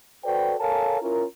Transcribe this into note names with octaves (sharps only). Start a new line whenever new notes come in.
F#4 A4 B4 C5 D5 G5
A4 A#4 C#5 F5 G#5 A5
C#4 E4 F4 A#4